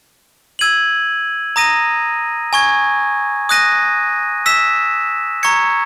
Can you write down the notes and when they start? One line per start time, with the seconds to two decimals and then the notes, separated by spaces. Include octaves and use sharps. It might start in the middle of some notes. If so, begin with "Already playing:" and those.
0.59 E6 G#6 D#7 F#7
1.56 A#5 D#6 A#6 D#7
2.53 G#5 C#6 G#6
3.49 D#6 F#6 A#6 D#7
4.46 E6 B6 E7
5.43 A#5 C#6 G#6 C#7